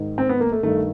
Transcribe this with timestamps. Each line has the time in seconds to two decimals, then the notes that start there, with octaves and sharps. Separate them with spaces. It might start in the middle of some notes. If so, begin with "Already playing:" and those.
Already playing: G#2 D#3
0.18 C4
0.29 B3
0.40 A#3
0.52 A3
0.63 G2 D#3 A3